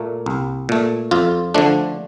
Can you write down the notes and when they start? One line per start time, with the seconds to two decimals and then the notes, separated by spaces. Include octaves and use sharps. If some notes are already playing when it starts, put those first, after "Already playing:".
Already playing: A#2 A3 A#3
0.26 C2
0.69 A#2 A3
1.11 F2 F4
1.54 D3 F3 A3 D4